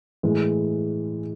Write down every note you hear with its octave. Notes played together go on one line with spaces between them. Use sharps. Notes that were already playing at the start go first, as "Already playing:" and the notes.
A2 E3 G#3